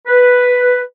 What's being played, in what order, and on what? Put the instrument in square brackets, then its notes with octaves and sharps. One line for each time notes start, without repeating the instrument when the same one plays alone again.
[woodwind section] B4